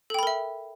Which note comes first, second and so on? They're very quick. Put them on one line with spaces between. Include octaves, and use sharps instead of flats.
A4 G5 B5 A#4 E5